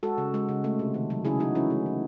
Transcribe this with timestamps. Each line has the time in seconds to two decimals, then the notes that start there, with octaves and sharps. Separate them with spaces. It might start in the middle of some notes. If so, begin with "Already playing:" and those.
0.03 G#3 F#4 A4
0.18 C#3
0.34 G#3
0.49 C#3
0.64 A3
0.79 C3
0.94 D#3
1.10 F#3
1.25 C#3 E4 G#4
1.40 C#3 D#4 F#4
1.55 E3 C#4 E4
1.70 A3
1.86 C#3